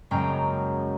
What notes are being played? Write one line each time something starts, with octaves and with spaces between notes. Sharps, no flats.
F#1 F#2 G#3 C#4 G5 A#5